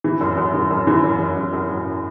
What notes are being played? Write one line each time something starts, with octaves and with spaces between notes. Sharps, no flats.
E3
F#2
F#2
E3
F#2
E3
F#2
F#2
F#2
F#2
F#2